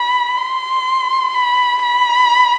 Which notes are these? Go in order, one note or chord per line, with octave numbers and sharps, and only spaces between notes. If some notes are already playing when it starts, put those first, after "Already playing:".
Already playing: B5
C6
B5
B5